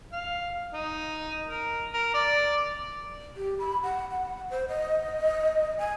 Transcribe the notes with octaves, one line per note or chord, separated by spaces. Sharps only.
F5
D#4
A#4
A#4
D5
G4
B5
F#5
F#5
C5
D#5
G#5